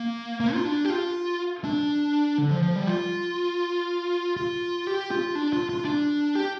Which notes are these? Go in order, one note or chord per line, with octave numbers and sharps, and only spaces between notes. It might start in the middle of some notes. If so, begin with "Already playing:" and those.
Already playing: A#3
A#3
F4
D4
G4
F4
D4
D3
F3
F3
G3
F4
F4
G4
F4
D4
F4
F4
D4
G4